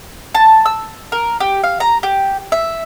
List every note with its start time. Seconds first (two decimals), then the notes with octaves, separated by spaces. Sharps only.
0.35 A5
0.66 E6
1.12 A#4
1.40 G4
1.63 F5
1.80 A#5
2.03 G4
2.52 E5